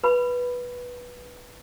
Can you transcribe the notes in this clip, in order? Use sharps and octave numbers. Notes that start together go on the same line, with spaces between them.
B4 B5